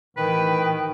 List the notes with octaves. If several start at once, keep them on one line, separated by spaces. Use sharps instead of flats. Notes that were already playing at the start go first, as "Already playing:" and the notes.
A1 D#3 E3 B4 G5